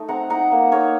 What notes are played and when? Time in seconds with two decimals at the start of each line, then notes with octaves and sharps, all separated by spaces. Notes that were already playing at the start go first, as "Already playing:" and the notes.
Already playing: A3 D#4
0.08 C4 F#5 A#5
0.30 D#4 F#5 A#5
0.51 A#3
0.71 D#4 C#5 F5